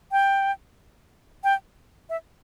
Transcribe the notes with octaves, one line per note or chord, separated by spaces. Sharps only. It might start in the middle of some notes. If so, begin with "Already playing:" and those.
G5
G5
E5